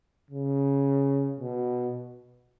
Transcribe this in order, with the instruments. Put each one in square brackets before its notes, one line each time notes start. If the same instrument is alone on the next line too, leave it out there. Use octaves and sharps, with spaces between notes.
[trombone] C#3
B2